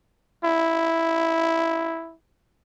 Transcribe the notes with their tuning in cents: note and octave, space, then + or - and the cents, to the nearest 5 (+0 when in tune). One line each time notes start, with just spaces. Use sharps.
E4 +0